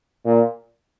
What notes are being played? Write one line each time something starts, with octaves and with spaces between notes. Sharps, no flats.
A#2